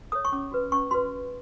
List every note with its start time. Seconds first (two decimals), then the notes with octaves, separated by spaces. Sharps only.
0.12 A4 C#5 D#6
0.25 C#6
0.32 C#4 D6
0.52 F#4 B4
0.72 C#4 C#6
0.91 F#4 B4 C6